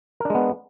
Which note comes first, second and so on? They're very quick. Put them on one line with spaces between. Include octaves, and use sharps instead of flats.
A#4 D4 G#3 B3